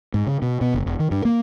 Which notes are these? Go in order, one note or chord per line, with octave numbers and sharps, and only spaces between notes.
G#2
C#3
B2
B2
F#1
E1
D#3
G2
A#3